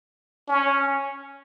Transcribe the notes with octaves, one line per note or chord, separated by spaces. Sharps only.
C#4